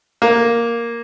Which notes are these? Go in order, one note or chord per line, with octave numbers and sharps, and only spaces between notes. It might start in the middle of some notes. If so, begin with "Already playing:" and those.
A#3